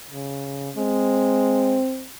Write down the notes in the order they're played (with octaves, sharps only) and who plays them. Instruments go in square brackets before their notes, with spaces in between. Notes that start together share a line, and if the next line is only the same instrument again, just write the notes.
[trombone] C#3
[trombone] G#3 [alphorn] C4